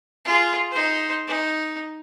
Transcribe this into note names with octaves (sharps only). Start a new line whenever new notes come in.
F4 G#4
D#4 C5
D#4